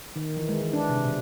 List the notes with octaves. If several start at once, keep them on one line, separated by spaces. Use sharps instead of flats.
D#3
E3
G#3
E3
D4
C3
B2